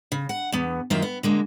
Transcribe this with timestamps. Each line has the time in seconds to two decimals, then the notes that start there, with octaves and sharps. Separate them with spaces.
0.12 C#3
0.29 F#5
0.52 E2 B3
0.90 F#2 D#3 F#3 A#3 F4 E5
1.02 B3
1.23 D3 G#3 A#3